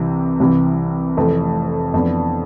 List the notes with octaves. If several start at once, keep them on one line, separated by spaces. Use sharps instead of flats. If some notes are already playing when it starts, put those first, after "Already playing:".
Already playing: C2 C3 E3
C2 C3 E3
F1 F2 E3 A3
F2 E3 B3 D4